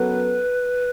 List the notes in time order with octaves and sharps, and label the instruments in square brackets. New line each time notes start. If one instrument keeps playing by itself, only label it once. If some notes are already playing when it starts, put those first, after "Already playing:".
Already playing: [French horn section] F#2 F#3 B3 A4 [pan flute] B4